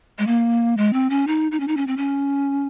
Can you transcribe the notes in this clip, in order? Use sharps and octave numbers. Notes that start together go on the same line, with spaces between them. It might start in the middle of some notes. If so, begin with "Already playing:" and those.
G#3
A#3
G#3
C4
C#4
D#4
D#4
C#4
D#4
C#4
C4
C#4